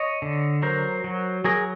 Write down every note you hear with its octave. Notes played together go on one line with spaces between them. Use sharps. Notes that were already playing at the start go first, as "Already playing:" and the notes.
Already playing: C#5 D#5
D3
F#3 A#4 C5
F#3
F#3 G#4 A#4